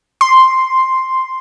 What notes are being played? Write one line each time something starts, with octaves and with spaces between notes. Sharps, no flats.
C6